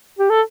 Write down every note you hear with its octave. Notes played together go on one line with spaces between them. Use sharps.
G4
A4